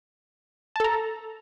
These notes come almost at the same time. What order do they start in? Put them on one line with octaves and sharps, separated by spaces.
A5 A4 A#5